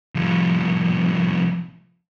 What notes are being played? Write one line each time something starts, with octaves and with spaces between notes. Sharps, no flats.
C2 F3